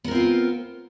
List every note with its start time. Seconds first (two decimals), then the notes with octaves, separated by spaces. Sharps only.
0.04 B3
0.08 A#4
0.11 C4
0.15 F4